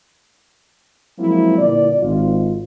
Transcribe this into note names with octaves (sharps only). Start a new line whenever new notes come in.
F3 F#3 G#3 A#3 C4 E4
G1 A#2 E4 D5
G#1 F4